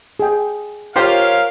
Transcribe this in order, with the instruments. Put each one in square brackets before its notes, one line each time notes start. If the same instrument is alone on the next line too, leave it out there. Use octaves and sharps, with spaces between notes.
[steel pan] G#4 G5
[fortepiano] F4 G4 C5 [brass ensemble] A#4 C#5 F5